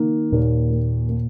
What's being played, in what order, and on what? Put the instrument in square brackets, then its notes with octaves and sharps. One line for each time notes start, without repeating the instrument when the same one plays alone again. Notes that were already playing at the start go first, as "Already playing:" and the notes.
Already playing: [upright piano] D#3 A#3
[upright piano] D#2 [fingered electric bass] A#2
[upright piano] A#3
A#3